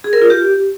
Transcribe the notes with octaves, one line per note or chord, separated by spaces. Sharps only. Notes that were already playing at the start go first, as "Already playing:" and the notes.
G#4
A#4
F4
G4